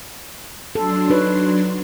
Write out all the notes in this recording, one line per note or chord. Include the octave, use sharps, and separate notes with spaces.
F#3 D4 A4 C6
D#4 B4 C#5